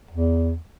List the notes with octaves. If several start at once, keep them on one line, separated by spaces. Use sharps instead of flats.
E2